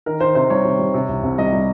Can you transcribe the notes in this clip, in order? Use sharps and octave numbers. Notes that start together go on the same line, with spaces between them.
D#3 A#4
D#3 C5
C3 C5
G3 C#5
C3
G3
C3
C2
C2
G3 D#5
G3